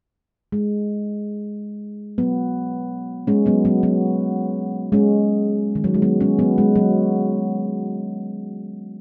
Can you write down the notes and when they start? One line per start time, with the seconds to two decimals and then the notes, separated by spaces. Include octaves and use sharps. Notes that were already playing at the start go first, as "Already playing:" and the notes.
0.52 G#3
2.18 F#3 B3
3.27 G#3 C#4
3.46 F#3 B3
3.65 F#3 B3
3.83 F#3 B3
4.92 G#3 C#4
5.75 D#3
5.84 F#3
5.94 G#3
6.02 F#3 B3
6.20 G#3 C#4
6.39 F#3 B3
6.58 G#3
6.75 F#3